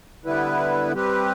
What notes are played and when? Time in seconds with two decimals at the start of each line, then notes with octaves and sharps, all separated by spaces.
0.24 D3 G3 B3 E4 B4
0.93 G3 C4 G4 B4